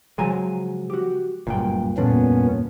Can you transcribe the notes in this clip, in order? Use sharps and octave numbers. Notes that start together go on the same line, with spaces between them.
C#3 F3 F#3 G#3 G#5 A#5
F#4 G4
F#1 D2 G2 A#2 G5
F2 A#2 D3 B3 C#4 D4